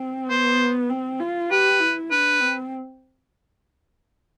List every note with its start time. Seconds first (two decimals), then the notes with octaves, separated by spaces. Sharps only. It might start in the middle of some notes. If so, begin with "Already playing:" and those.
Already playing: C4
0.29 B3 C5
0.90 C4
1.20 F4
1.51 G4 B4
1.80 E4
2.11 D4 B4
2.41 C4